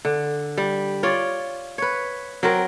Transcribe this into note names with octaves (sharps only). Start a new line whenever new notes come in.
D3
G3
F4 C#5 D5
B4 C#5
F#3 C4 A#4